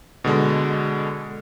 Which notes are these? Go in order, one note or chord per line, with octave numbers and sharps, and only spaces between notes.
B2 D3 G#3